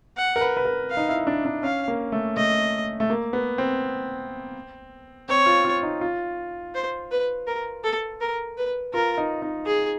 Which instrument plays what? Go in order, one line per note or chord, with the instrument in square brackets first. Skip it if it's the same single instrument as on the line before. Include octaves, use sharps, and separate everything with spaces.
[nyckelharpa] F#5
[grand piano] A#4
B4
B4
A#4
[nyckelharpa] F5
[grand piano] D#4
E4
D4
D4
[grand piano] C#4 [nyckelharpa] F5
[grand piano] A#3
A3
[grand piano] A3 [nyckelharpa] D#5
[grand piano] A3
A#3
B3
C4
[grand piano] C4 [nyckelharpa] C#5
[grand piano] F4
F4
D#4
F4
[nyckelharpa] C5
B4
A#4
A4
A#4
B4
[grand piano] F4 [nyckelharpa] A#4
[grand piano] D#4
D#4
[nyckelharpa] G#4